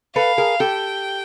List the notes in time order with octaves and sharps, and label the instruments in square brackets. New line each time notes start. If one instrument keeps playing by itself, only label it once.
[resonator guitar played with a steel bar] A4 B4 [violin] F5
[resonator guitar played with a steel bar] G#4 A#4
[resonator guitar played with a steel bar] G4 A4 [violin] G5